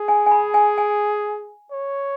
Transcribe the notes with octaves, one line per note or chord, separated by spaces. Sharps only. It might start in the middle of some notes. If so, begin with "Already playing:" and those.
Already playing: G#4
G#5
G#5
B5
G#5
G#5
C#5